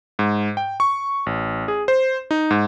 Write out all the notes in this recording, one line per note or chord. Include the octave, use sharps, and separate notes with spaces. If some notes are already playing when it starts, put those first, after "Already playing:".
G#2
G5
C#6
A1
G#4
C5
D#4
G#2